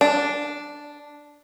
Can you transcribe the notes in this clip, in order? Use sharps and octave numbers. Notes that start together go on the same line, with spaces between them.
D4